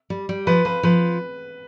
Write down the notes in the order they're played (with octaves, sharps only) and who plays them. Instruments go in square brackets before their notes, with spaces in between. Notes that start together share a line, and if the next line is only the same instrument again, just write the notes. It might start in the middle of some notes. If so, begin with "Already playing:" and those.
[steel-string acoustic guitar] G3
G3
[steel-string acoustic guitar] F3 [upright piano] B4
[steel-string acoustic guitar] F3 [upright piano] B4
[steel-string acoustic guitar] F3 [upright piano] B4